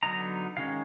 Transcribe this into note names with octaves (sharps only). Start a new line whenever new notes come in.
D3 F#3 B3 D#4 A#5
D#3 G#3 C#4 F5